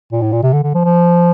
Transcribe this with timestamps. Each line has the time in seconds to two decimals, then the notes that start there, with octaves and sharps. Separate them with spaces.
0.12 A#2
0.21 A2
0.32 A#2
0.43 C3
0.53 D3
0.64 D3
0.74 F3
0.85 F3